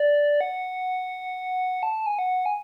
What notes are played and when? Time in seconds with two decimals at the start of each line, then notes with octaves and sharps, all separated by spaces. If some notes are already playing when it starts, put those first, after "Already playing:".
Already playing: D5
0.41 F#5
1.83 A5
2.06 G#5
2.19 F#5
2.46 G#5